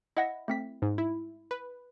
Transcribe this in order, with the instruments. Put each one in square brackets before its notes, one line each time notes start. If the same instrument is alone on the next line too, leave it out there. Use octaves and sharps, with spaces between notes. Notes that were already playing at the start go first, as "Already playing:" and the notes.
[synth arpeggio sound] E4 [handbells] D#5 F#5 A#6
[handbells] A3 C4 B6
[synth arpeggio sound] G#2
E4
B4